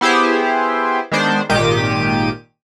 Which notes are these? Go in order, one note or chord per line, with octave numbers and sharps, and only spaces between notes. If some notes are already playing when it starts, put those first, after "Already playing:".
B3 E4 G4 G#4 C5
D#3 G#3 B3 D4 C5
G#1 A#2 D#3 G4 D6 D#7